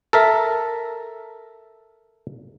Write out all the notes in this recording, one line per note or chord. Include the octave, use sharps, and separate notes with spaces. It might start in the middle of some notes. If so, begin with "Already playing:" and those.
A4 A#4 E5